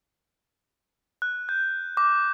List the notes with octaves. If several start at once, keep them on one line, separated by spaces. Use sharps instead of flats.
F#6
G6
D6